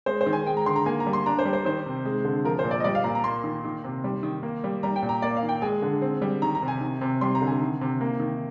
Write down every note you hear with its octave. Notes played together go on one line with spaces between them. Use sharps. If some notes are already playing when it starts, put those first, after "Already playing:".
G#3 C5
C5
D#3
G#5
G#3 G5
A#5
D3 C6
A#5
A#3 G#5
A#5
G3
C6
D4 A#5
C5
G3
C5
D#3 C5
C3
G#3
D3
F3 A#4
C5
A#2
D5
D#5
G3 D5
F5
A#2 A#5
A#5
A#3 C6
D#3
D#3
C3
G3
D#3
A#3
G3
G3 A#5
G5
A#2
A#5
A#3 D5
F5
D#3
G5
G#3 G#5
D3
C4
G3
D#3 A#5
A#5
C3
G#5
D#3
C3
G3 C6
A#5
D3
G#5
D#3
C3
A#3
D#3